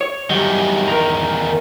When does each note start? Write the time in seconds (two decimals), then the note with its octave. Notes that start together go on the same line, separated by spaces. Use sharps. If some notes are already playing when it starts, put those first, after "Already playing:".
0.01 C#5
0.30 E2 D#3 F#3 G3
0.88 A#4 A#5